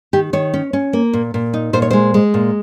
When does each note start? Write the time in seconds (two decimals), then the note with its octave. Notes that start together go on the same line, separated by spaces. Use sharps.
0.13 D#3 G4
0.33 D#3 C#5
0.53 C#4
0.73 C#4
0.93 A#3
1.13 A#2
1.34 A#2
1.54 D#4
1.73 A#2 C5
1.82 C#5
1.90 G#3 C5
2.14 G#3
2.34 A#2